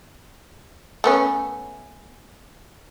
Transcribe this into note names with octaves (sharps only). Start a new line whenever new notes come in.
A3 B3 C#4